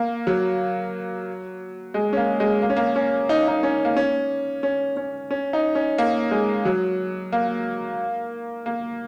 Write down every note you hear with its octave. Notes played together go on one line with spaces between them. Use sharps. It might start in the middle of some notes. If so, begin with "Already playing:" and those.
Already playing: A#3
F#3
G#3
C#4
A#3
G#3
A#3
C#4
A#3
C#4
D#4
D#4
C#4
A#3
C#4
C#4
C#4
C#4
D#4
C#4
A#3
G#3
F#3
A#3
A#3